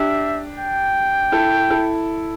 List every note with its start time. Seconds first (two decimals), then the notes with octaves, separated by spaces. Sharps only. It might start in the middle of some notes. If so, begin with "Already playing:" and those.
Already playing: D4 G4 E5
0.58 G5
1.32 E4 A4
1.70 E4 A4